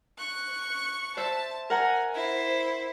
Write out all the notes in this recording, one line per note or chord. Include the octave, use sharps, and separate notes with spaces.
C#6 F#6
C5 E5 A5
A#4 F#5 G#5 A#5
E4 C5